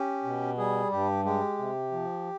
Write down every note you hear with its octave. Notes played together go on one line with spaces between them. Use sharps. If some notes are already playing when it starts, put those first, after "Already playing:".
Already playing: C#4 G4
B2
G3 G#4
G2 G4
G#3 G4
C3
F3